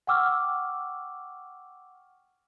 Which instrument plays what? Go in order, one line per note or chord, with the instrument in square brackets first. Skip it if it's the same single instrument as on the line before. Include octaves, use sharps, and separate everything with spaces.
[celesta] F#5 G5 C#6 D6 E6 F6